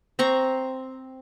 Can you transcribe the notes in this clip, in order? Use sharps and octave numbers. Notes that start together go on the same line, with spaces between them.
C4 A#5 C#6